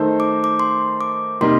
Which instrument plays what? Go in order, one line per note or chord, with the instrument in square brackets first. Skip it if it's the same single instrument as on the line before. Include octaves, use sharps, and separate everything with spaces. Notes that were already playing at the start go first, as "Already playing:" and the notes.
Already playing: [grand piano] D#3 A3 D#4 A4 C5
[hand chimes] D6
D6
C6
D6
[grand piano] C3 G3 A#3 D#4 G4 [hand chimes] C6